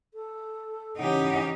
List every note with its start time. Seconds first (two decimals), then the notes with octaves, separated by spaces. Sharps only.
0.14 A4
0.98 C#3 E3 C#4 D#4 G4 F#5